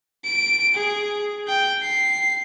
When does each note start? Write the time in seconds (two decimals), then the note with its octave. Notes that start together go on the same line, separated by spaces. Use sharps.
0.25 D7
0.74 G#4
1.48 G5
1.83 C7